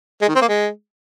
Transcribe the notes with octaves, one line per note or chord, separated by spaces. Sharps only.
G#3
D#3
C4
A#3
G#3